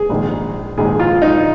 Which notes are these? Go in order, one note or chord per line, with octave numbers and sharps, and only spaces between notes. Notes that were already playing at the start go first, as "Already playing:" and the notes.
Already playing: G#4
A#1 G#2 D#3
A#1 G#2 D#3 G#4
F4
D#4